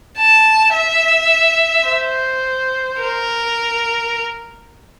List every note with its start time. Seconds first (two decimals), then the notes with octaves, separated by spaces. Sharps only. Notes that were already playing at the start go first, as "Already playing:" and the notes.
0.18 A5
0.74 E5
1.88 C5
3.01 A#4